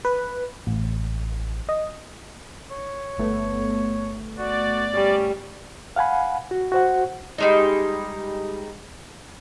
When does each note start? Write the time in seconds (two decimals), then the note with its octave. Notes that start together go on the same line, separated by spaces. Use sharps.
0.05 B4
0.67 A1
1.69 D#5
2.71 C#5
3.18 G1 A3 B3
4.38 F#4 D5
4.94 G3 C#4
5.96 F5 F#5 G#5 B5
6.51 F#4
6.72 F#4 C5 F#5
7.38 G3 G#3 D#4